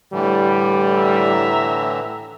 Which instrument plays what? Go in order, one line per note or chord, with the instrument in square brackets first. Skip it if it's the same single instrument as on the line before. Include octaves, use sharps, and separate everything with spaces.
[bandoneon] A2 D3 E3 [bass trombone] G3
[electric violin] E5 A#5